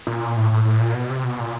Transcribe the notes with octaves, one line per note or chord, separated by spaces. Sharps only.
A#2
A2
A2
A2
A#2
B2
C3
B2
A#2